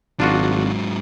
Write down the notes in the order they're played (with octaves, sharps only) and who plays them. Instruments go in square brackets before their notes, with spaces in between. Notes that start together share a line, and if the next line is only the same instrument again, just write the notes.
[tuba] G#1 [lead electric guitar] G#2 F#3 [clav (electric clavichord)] D4 F4 F#4